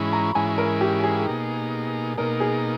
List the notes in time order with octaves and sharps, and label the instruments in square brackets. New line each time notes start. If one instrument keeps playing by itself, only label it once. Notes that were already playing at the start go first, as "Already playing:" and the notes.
Already playing: [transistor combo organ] G#2 E3 G#3 C#4 E4 [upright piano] B5 C#6
[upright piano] A#5
[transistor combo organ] G#2 E3 G#3 C#4 E4 [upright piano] G#5
[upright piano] A#4
G4
G#4
[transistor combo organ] B2 A#3 D#4
[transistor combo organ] B2 A#3 D#4 [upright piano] A#4
[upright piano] G#4